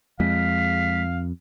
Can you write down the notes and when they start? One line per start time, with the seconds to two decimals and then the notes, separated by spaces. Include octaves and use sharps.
0.20 F2 G#3 F5 B6